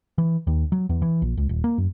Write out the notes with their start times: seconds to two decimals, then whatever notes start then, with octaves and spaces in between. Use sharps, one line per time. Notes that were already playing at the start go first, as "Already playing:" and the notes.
0.18 E3
0.47 D#2
0.72 F#3
0.89 E2
1.02 E3
1.22 A#1
1.37 C#2
1.49 D#1
1.64 A#3
1.78 F#2